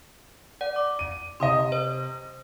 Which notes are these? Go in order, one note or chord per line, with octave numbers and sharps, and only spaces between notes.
D5 F#5
D6
D#7
C3 D#5 C6 D#6
C5